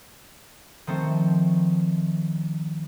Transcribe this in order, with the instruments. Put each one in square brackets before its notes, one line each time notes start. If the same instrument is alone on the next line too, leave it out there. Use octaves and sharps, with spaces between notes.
[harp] D#3 F3 A3 C4